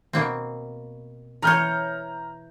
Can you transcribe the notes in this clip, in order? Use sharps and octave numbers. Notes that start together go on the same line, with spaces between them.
B2 A#3 C4
E3 C#5 A#5 F6 G6